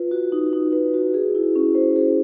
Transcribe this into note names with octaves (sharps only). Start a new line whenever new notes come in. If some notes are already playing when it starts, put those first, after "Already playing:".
Already playing: F4 B4
F#4
D#4
D#4
B4
F#4
G#4
E4
C#4
C5
G#4